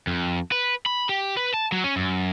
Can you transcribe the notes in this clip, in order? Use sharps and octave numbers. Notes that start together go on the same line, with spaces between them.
F2
B4
B5
G4
B4
A5
F#3
C#4
F#2